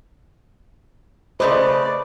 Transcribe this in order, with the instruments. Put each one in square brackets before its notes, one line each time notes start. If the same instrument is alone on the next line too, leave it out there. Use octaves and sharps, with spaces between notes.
[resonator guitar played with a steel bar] C#3 A3 D#5 [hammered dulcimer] B4 [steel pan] C5 D6 [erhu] D5